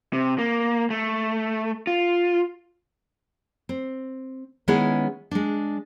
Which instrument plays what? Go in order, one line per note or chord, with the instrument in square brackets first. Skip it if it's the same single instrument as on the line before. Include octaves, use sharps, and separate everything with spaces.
[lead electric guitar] C3
A#3
A3
F4
[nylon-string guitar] C4
D#3 G#3 B3 C#4 E4 G#4
G#3 D4